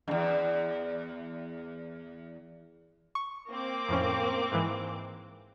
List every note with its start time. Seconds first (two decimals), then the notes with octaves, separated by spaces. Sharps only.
0.08 E2 G2
3.15 C#6
3.50 A#3 C4 D6
3.89 F2 A2 C#4
4.52 G#2 E3